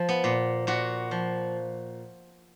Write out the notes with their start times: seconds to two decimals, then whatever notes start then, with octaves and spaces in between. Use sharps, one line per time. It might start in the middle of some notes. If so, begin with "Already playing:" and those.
Already playing: F3
0.09 B3
0.24 A#2
0.67 A#2 F#4
1.11 F3